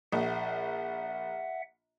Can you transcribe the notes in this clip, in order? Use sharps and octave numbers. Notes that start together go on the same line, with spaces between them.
A#1 E5 F#5